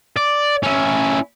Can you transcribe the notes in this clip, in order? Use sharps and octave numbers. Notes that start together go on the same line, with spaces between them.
D5
C#4 E4